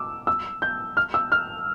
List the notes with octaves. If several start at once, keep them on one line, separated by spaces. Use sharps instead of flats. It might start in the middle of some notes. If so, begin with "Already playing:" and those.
Already playing: D6 E6
E6
G6
F6
E6
F6